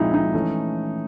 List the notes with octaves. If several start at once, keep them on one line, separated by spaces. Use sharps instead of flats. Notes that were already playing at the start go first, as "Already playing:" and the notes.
Already playing: A#2 F3 G#3 C4 D#4 E4
D#4
E3 A3 C#4